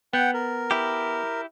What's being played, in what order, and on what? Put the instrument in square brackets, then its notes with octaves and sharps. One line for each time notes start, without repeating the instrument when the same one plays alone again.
[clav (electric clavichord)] B3 [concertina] F#5 G5
[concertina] A#4
[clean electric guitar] E4 G4